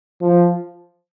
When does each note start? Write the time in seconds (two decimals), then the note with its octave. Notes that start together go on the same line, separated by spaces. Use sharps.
0.21 F3